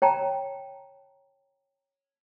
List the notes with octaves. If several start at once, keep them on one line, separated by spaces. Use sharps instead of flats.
C#5 G5 A5 A#5